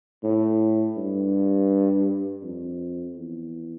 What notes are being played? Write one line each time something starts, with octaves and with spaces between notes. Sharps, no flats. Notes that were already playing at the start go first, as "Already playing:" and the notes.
A2
G2
F2
E2